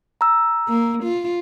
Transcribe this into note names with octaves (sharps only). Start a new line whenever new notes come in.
A#5 E6
A#3
F4